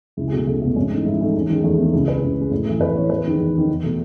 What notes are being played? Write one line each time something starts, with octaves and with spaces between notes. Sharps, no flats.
C#2 E4
G#4
B2 A3 F#4
C#2 A3
B2 A3 B3
G#2 C#4
E3 A3 D#4
G#2 E4
E3 A3 D#4
E2 C#4
D#3 G#3
E2 A3
D#3 G#3 B3
C#2 E4
C#3 G#3 B4
C#2
C#3 G#3
A2
E3 A3
A2 B4
E3 A3 C#5
E2 B4
D#3 G#3
E2
D#3 G#3
E2
B2 A3